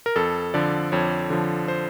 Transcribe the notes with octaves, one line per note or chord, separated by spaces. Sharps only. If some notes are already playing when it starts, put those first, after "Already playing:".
A#4
F2 A4
D3 F3 D5
F2 C#5
D3 F3
C5